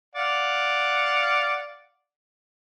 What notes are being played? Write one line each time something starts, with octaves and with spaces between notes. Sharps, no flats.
D5 F5 F#5